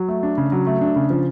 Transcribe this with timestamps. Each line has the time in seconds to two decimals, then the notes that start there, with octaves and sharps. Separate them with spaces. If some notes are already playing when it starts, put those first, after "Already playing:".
Already playing: F#3
0.08 A3
0.23 D4
0.38 C#3
0.52 F#3
0.67 A3
0.81 D4
0.96 C#3
1.10 F3